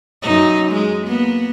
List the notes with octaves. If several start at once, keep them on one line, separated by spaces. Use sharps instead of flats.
F#2 D#4
G#3
A#3 B3